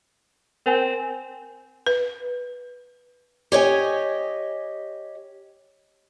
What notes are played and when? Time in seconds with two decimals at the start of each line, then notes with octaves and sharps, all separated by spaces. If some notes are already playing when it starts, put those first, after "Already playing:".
0.66 C4 A#4 G#5
1.86 B4
3.52 G4 C#5 D#5 G#5